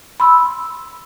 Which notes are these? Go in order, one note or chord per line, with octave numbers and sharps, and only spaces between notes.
B5 C6 E6